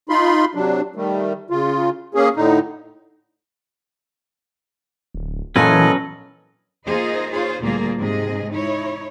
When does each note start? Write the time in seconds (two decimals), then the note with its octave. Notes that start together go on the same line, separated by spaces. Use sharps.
0.09 D#4 F4 B5 C6
0.55 C3 F#3 D4
0.96 D#3 G3 A3
1.50 C#3 F4
2.15 A#3 C#4 G#4
2.36 A2 D3 D#4
5.15 D1
5.56 A#2 E3 F#3 C#4 A4 B4 D#5 G#5
6.86 A#3 D#4 F4 G#4 C5 D#5
7.32 F4 G#4 C5 C#5
7.62 D2 A#2 G3 A#3 F4 G#4
7.99 G#2 C3 G#4 D#5
8.50 D#4 E4 C#5